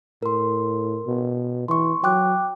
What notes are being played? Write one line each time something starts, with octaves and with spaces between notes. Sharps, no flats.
A2 A#4 C6
B2
E3 C6 C#6
F#3 G5 D6 F#6